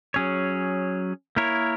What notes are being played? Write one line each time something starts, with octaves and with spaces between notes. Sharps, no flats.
F#3 C#4 G#4 C#5
A#3 E4 A#4 C#5